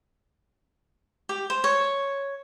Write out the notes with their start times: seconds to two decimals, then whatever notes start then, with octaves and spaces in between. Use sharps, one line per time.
1.29 G4
1.50 C5
1.64 C#5